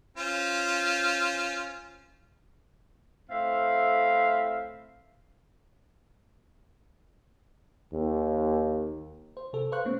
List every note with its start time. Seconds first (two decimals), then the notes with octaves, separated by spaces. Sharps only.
0.17 C#4 F4 C5
3.30 A2 C4 E5 F5
7.92 D#2
9.37 C5
9.53 C3 A4
9.72 B4 C5 F5 C#6 F#6
9.85 A3 B3 C#4